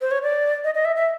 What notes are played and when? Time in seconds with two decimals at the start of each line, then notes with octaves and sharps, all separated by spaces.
0.01 C5
0.11 C#5
0.22 D5
0.64 D#5
0.74 D#5
0.85 E5
0.96 E5